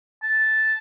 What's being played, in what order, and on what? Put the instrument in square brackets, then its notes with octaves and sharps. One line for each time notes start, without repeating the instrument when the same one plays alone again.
[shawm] A5